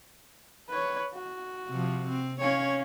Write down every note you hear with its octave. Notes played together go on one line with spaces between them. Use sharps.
B4 C#5
F#4
C3 F3
C4
C#4 C#5 F5